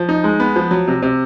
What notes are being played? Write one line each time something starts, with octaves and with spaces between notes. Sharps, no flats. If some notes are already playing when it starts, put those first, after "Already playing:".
Already playing: F3
D#4
G#3
B3
F3
F#3
C3
C3